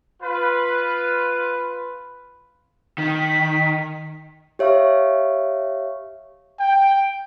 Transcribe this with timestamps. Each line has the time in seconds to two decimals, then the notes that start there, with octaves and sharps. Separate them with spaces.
0.22 F4 B4
2.98 D#3 B6
4.59 G4 C#5 E5 F5 C#6
6.60 G5